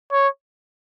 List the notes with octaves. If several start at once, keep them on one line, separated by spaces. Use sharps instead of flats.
C#5